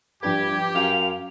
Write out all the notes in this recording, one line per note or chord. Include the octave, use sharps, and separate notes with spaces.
A#1 G2 D4 G4 B4 G#6
F#2 F5 F7